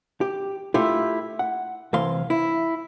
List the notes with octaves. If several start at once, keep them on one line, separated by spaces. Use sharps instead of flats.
G4
A3 E4 F4 G4
F#5
C2 E3 F5 C6
E4